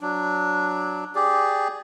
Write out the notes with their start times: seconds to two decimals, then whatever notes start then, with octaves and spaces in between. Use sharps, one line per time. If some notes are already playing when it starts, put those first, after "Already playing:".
0.01 F#3 D4
1.15 G4 G#4 D5